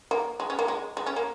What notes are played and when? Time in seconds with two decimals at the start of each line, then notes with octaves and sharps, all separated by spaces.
0.11 A#3
0.40 G#3
0.50 C#4
0.59 A#3
0.68 G#3
0.97 G#3
1.06 C#4
1.16 A#3